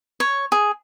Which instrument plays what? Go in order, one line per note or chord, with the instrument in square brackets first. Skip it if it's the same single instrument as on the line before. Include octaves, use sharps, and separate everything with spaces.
[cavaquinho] C#5
G#4